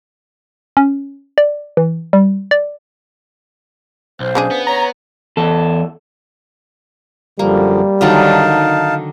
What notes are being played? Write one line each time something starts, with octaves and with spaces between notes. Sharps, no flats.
C#4
D5
E3
G3
D5
B1 C5
C#3 D4 G#4
B3
C#5 A#5
E2 A4
F#2 D3 F3 G3 A#3
D3 D#3 F#3 D#4 F5 A5